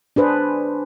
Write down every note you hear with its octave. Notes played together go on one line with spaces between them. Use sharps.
D4 G#4 B4 C5